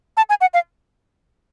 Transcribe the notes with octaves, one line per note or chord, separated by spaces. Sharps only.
A5
G#5
F#5
F5